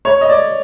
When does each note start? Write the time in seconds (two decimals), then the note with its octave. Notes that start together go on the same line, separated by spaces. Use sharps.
0.05 C#5
0.21 D#5
0.29 D5